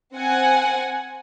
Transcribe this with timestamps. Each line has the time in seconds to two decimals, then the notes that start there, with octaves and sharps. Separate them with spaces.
0.13 C4 F#5 G#5